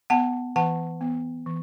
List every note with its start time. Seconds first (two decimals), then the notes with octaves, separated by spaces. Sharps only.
0.10 B3 F#5 A5
0.56 E3 F#5 A5
1.01 B3
1.46 E3